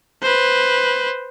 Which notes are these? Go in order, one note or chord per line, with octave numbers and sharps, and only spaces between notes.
B4 C5